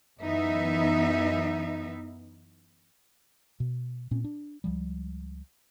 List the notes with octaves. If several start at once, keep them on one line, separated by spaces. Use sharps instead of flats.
F#2 E3 B3 D#4 E5
B2
A#2 C4 C#4
D4
C#2 F3 G3